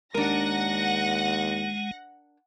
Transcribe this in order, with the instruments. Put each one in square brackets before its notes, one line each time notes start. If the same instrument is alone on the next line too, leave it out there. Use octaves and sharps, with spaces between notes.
[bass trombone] D#2 [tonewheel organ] G#3 [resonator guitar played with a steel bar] D4 A#4 [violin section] F#5 A#6